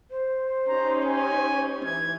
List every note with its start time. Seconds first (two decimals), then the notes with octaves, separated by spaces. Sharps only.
0.11 C5
0.68 C#4 D#4 G4 A#5
1.05 G#5
1.84 E3 G#6